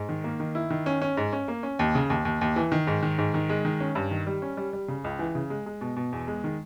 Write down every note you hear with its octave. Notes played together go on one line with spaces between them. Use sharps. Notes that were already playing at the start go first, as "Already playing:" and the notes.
Already playing: G#2
D#3
A#3
D#3
E4
D#3
C#4
C#4
G#2
C#4
A#3
C#4
D#2
C#3
D#2
D#2
D#2
E3
D#3
G#2
D#3
G#2
D#3
G#3
D#3
C#4
G2
D#3
G3
C#4
G3
G3
C#3
C#2
E3
C#3
G#3
G#3
B2
B2
E2
G#3
D#3